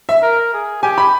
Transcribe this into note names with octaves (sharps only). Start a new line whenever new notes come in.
E5
A#4
G#4
G4 G#5
B5